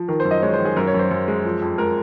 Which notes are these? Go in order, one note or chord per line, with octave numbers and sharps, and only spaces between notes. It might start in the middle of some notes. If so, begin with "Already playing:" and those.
Already playing: F3
D#3 A#4
C5
F#2
D#5
G#3 C#5
C5
D#3
G#4
F#2 A#4
C#5
F#2
C5
F#2
G#3
F3
F2
G#3 A#4